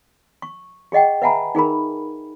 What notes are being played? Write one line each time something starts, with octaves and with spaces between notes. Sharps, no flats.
C#6
G4 G#4 D#5 F#5 G5
B4 E5 F#5 G#5 A#5 B5
D#4 G#4 A#4 B5